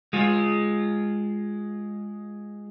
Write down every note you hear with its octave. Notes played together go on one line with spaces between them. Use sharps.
G#3 F4